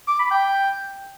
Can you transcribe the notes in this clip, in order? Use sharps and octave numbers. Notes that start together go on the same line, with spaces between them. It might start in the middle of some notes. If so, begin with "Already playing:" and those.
D6
B5
G5